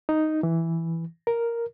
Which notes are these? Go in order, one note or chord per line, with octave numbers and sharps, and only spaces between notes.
D#4
E3
A#4